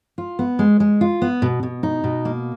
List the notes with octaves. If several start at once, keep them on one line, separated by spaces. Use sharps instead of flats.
F4
B3
G#3
G#3
F4
B3
B2
B2
D#4
B2
A#3